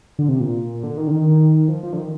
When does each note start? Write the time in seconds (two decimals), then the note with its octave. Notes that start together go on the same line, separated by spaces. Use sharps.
0.19 D3
0.29 C3
0.40 A#2
0.83 D3
0.98 D#3
1.07 D3
1.12 D#3
1.68 F3
1.83 F3
1.93 D3
1.98 D#3